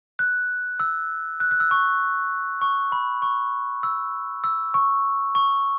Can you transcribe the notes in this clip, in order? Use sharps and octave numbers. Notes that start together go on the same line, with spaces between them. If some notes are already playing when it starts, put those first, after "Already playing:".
F#6
E6
F#6
F#6
E6
C#6
C#6
B5
C#6
E6
E6
C#6
C#6